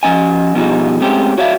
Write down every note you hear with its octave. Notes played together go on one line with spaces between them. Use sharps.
F3 C#4 D#5 G#5
B2 F3 G3 D4 D#4 G#4
G#3 A3 C4 C#4 G4
F#4 C#5 D5 E5 F5